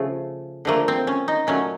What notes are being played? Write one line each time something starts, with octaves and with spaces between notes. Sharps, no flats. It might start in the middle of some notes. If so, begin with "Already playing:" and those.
Already playing: C#3 F3 A3
D3 F3 A3 A#3
C4
C#4
D#4
A#2 F#3 A3 C#4